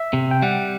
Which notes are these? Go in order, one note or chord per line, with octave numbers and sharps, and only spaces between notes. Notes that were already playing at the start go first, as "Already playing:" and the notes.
Already playing: E5
C3
G5
G3 F#5